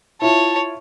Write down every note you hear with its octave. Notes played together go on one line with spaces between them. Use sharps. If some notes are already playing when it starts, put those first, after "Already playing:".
E4 F4 C#5 A5